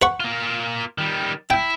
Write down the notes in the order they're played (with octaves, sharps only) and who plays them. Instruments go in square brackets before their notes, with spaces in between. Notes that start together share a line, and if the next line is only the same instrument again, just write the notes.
[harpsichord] B4 F#5 C#6
[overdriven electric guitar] A#3 F4
D#3 G3
[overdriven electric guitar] E4 E5 [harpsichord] G5